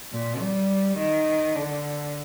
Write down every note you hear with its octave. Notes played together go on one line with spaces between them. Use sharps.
A#2
G3
D#3
D3